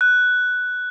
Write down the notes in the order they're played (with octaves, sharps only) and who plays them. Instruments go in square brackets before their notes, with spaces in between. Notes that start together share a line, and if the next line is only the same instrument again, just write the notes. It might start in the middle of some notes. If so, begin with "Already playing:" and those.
[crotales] F#6